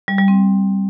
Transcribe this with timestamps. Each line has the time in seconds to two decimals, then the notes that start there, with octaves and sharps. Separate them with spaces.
0.08 G3
0.18 G3
0.28 C4